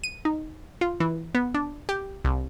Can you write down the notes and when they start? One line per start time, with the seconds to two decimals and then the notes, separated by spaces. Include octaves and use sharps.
0.04 D#7
0.25 D#4
0.81 F4
1.00 E3
1.35 B3
1.54 D4
1.89 G4
2.25 C2